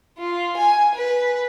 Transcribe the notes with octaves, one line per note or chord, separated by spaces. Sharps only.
F4
G#5
B4